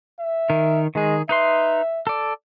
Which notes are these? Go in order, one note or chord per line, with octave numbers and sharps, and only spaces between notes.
E5
D#3 A#4
D#3 G#3 G#4
D#4 B4 E5 C6
A4 D5